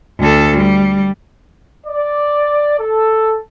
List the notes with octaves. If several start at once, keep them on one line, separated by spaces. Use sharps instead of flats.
D2 A4
G3
D5
A4